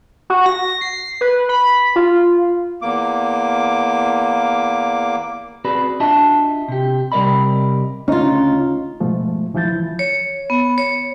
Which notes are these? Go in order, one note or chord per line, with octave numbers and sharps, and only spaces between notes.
F#4
A#6
C7
B4
B5
F4
E2 A#3 D6
C4 F#4 G#4 B4 D5 B5
D4 F4 F#4 D#5 E5 A5
C3 G4
C3 G3 A#4 D5 D#5 B5
D2 C#3 C#4 D#4 F4
G#2 B2 F3 A3
C#2 E3 F3 E4 G6 A6
C#5
B3
C#5